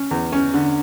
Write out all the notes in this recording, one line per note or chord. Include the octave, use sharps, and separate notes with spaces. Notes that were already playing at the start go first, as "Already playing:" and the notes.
Already playing: C#4
E2
C#4
D3